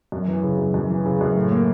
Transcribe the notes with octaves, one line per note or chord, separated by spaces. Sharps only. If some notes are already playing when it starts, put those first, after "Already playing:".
F#2
E3
C#3
F#2
F#2
E3
C#3
F#2
A2
A#3